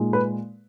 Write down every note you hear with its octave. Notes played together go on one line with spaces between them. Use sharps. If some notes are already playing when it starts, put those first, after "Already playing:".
Already playing: A#2 G#3 D#4
B4